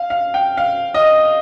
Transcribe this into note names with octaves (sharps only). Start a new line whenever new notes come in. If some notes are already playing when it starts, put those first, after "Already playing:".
Already playing: F5
F5
G5
F5
D#5